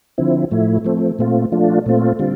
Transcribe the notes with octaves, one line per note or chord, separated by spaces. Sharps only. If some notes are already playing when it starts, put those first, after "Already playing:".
D3 F3 C4 E4
A2 F3 A3 E4
F3 A3 C4
A#2 A3 C4 F4
F3 A3 D4 F4
A#2 A3 C4 F4
D3 G3 C4 F4